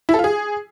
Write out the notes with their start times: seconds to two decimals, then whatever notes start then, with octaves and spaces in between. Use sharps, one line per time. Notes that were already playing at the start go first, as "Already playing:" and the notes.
0.09 E4
0.14 A4
0.19 F4
0.24 G#4